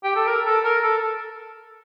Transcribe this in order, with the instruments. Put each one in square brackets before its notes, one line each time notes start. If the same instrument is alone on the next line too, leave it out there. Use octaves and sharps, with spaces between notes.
[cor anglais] G4
A4
A#4
A4
A#4
A4